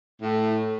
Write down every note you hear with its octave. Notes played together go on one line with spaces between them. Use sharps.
A2